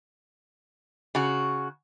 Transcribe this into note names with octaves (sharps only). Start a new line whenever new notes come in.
C#3 F#4